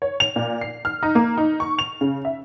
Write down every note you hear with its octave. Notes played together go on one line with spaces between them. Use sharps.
C#5
F7
A#2
C7
F6
D#4
A#3
D#4
C#6
F7
C#3
E5